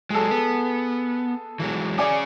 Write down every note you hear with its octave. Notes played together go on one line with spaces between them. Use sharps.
F#3 G#3 G#4 A4
B3
E3 F#3 G#3
C#4 G4 G#4 D5 G#5 D6